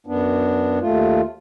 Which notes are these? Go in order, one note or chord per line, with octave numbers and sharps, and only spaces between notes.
F#2 B3 D4
D#2 A3 F4